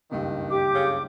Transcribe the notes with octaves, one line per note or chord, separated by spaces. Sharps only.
F#1 C#2 G2 D#3
G4 D6
C#3